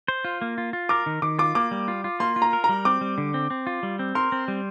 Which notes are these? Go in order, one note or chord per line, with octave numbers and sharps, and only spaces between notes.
C5
F4
A#3
F4
F4
A#4 D6
D#3
D#3 D6
F4 D6
A#3 D6
G3
F4
F4
A#3 C6
F4
A#5
A#4
A#5
G3
C4 D6
G3
D3
C4
C4
F4
G3
C4
A#4 C6
C4
G3